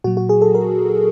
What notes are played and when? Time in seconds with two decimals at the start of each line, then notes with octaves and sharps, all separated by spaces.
0.04 A#2 F#3 F#4
0.17 F#4
0.29 G#4
0.42 A4
0.55 A#4